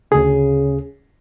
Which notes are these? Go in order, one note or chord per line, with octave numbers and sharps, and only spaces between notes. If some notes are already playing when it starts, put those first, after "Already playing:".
D2 C#3 G#4